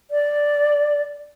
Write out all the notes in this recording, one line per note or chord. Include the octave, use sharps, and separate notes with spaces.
D5